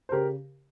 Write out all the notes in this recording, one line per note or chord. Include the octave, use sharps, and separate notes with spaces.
C5
C#3 G4 A#4